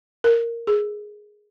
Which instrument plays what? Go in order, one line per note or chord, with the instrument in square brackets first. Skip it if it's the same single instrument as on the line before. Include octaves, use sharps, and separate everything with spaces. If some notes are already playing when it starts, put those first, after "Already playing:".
[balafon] A#4
G#4